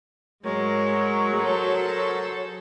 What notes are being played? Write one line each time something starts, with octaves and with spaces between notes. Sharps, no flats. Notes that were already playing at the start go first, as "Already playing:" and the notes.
G#2 F#3 G#3 A#4 C#5
G#4 A4 C5